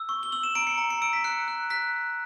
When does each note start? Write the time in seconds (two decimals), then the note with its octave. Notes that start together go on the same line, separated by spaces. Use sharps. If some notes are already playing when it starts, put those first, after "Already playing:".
Already playing: E6
0.09 C#6
0.23 G7
0.32 E6 F#7
0.43 E7
0.55 A#5 D7
0.67 C#7
0.78 A#5
0.90 C#7
1.02 E6 D7
1.13 B6
1.24 F#6 C#7
1.48 F#6
1.70 F#6 B6